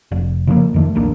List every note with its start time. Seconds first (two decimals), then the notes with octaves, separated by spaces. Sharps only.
0.12 F1
0.47 C#3 F3 G3 A#3
0.74 F2 D#3 A3
0.95 A#1 D#2 A#3 D4